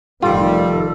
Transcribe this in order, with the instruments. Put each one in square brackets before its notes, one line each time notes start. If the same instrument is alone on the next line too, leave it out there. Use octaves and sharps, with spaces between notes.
[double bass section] F1 D#3 [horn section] G3 [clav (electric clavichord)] F4 [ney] A4